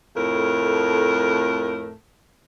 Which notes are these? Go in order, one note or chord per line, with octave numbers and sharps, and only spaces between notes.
F2 A2 A3 A#4